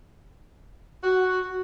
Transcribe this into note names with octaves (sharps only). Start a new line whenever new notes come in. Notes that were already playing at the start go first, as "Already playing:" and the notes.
F#4